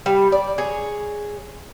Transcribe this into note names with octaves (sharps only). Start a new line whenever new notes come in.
G3
D5
G#4 C#5